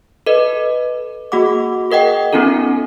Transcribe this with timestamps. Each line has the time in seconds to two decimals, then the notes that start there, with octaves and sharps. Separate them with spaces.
0.27 A4 B4 D#5
1.32 A#3 F#4 G#4 F#5 D6
1.91 G#4 A#4 D#5 F#5 G5
2.33 B3 C#4 D#4 F4 A4